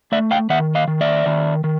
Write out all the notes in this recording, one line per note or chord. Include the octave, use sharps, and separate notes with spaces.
A3 D5 E5
F5 G5
D#3 E5 F#5
D#5 F5
D#3
D5 E5
D#3
D#3